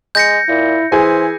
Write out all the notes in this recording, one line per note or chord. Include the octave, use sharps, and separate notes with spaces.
G#3 G6 A#6 C#7
A#2 E4
E3 G#4 C5 G#5